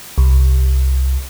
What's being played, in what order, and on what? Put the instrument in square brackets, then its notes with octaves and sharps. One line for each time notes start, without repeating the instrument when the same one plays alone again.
[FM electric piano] C2